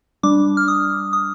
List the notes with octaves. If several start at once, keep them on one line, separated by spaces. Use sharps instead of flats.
G3 D4 D6
F6
D#6
D#6